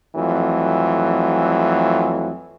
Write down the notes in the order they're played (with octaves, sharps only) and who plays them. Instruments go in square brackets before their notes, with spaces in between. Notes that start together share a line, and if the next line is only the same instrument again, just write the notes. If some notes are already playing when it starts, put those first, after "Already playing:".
[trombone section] F2 E3 F#3 A3